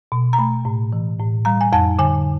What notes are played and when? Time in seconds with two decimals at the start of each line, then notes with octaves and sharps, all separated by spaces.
0.12 B2
0.33 A#5
0.39 A3 B5
0.65 A2
0.93 E3
1.19 A2
1.45 G3 A#5
1.61 G#5
1.73 F2 A5
1.99 D3 G#5